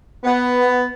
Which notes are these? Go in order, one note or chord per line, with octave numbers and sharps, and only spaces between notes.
B3